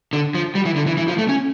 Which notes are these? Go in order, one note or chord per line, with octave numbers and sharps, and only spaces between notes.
D3
F3
G3
E3
D3
E3
E3
F3
A3
C#4